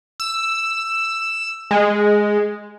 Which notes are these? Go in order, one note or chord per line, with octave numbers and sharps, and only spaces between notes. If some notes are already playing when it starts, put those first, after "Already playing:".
E6
G#3